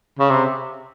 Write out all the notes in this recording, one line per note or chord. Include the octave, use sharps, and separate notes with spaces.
C#3
C3